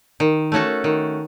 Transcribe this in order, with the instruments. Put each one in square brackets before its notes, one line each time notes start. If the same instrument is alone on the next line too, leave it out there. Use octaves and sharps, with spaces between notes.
[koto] D#3
A3 C#4 F#4 A4
D#3